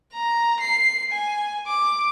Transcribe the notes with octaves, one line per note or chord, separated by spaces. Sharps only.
A#5
C7
G#5
D6